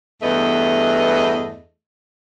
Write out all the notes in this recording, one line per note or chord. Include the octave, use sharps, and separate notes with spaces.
E2 G2 A3 B3 D#5